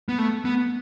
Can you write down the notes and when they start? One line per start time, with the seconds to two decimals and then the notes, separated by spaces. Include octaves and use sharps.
0.09 B3
0.18 A3
0.45 B3